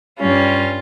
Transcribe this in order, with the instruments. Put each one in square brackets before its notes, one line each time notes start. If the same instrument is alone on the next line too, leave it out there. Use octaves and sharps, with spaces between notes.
[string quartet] G2 G3 C#4 F4